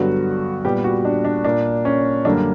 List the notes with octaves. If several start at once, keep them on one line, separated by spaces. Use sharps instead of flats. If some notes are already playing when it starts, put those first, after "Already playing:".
Already playing: G2 D3 F#3 B3 F#4
A#2 G3 B3 G4
F#4
D4
D4
A#2 A#3 D4
C#4
F#2 D3 G3 A#3 D4